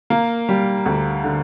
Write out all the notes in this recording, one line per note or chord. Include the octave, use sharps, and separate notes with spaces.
A#3
G3
D2
D3